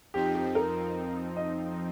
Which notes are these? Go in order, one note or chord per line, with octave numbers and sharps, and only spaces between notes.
F2 F3 C4 D#4 G4
G4
A#4
D#5